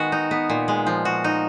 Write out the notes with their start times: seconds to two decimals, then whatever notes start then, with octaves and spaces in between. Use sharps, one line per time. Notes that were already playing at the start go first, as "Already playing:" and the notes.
Already playing: D#3 G#3 B3 F#4
0.12 D#4
0.31 B3
0.50 A#2
0.68 G#3
0.86 F3
1.05 F#4
1.24 D#4